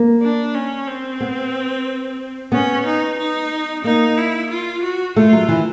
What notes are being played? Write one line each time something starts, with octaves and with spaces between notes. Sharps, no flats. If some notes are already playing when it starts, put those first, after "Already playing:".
Already playing: A#3
D4
C#4
C4
B3
B3 C#4
D#4
D#4
A#3 D#4
E4
F4
F#4
A3 F4
F#3
E3